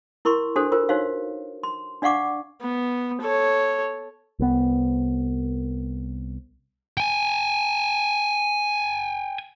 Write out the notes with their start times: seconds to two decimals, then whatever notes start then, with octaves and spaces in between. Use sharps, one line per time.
0.25 E4 A#4 C6 C#6
0.56 D4 F#4 A4 C5
0.72 F4 A#4 C5
0.89 D#4 F#4 C5 C#5 F5
1.63 C6
2.02 D4 D5 F5 F#5 C#6 D6
2.61 B3
3.21 A4 C#5
4.39 C2 B3
6.97 G5 G#5